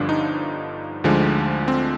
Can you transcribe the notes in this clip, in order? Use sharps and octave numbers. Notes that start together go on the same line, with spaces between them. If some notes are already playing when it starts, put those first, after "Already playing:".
Already playing: G1 G2 D3 F3 D4
D#4
D2 D3 F3 G#3
C4